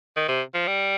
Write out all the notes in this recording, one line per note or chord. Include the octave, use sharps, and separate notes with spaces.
D#3
C3
F3
G3